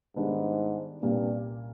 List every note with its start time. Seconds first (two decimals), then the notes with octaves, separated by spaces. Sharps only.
0.16 G#2 D#3 G3 B3 D4
1.02 C2 G2 A#2 G3 A#3 C#4